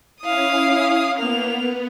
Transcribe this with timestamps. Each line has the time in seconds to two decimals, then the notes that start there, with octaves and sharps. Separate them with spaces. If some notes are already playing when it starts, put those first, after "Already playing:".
0.21 C#4 E4 F5 D#6
1.18 A#3 B3 F7